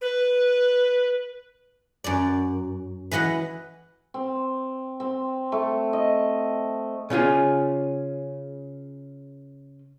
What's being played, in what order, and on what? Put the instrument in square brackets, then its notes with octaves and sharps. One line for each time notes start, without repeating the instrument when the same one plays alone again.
[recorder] B4
[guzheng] F#2 D5
E3 B4 D#5 F#5
[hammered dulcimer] C4
C4
A3
D#5
[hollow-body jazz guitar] C#3 C#4 F4 G#4